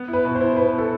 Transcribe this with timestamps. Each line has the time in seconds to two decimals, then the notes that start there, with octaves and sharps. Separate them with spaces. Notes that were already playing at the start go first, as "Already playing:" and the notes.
Already playing: B3
0.08 E4
0.13 B4
0.25 B2
0.35 C5
0.41 E4
0.56 B2 B4
0.73 B2
0.78 A4